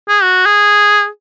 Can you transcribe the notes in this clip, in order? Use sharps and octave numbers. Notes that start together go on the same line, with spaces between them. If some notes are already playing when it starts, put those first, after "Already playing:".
G#4
F#4
G#4